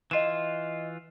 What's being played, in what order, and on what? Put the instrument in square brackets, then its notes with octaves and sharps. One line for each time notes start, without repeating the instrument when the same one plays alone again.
[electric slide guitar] E3 F4 [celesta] D#5 E7